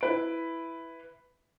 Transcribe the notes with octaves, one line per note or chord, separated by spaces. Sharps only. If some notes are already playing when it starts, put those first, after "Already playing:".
E4 B4 D7